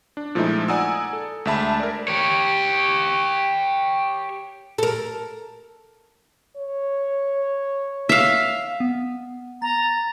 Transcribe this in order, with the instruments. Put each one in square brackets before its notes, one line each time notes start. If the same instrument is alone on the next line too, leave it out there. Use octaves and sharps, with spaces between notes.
[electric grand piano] D4
A#2 F3 G#3 A3 D#4 E4
D5 F#5 G#5 A#5 D#6 E6
A4
D2 G#3 E5 A5 B5
A#4 D5
[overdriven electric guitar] G4 C#5
[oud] A4 A#4
[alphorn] C#5
[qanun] E5 F5
[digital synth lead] B3
[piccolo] A#5 [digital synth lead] A6